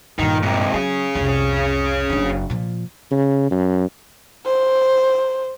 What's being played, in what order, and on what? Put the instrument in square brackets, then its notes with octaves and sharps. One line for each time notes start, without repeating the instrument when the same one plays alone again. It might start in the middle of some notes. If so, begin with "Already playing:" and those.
[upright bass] G2 A#2 [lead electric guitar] D#3
[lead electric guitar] G#2 C3
[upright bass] F#3 [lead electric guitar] C#4 G#4
[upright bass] C2 F2
F#1 D4
A#2 F3
[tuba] C#3
F#2
[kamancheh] C5